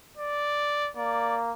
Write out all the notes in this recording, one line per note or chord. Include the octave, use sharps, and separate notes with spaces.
D5
A#3 D5